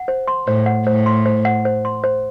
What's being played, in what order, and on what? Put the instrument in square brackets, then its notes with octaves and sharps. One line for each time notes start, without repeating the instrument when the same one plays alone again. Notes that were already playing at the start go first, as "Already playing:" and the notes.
Already playing: [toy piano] F#5
C5
C6
[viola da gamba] A2 [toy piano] C5
[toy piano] F#5
[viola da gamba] A2 [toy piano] C5
[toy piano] C6
C5
F#5
C5
C6
C5